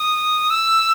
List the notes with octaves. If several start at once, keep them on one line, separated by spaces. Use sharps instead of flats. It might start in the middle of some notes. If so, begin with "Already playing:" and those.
Already playing: D#6
E6